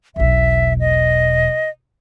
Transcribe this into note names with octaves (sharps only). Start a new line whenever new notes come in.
E1 B1 E5
D#5